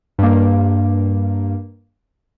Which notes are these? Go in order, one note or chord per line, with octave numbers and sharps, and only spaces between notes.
G2 A#3